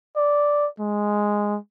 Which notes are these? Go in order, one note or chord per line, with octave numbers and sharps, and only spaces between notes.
D5
G#3